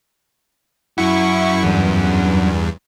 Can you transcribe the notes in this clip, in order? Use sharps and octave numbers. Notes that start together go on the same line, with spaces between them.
F#2 E4 F#4 C#6
E2 G2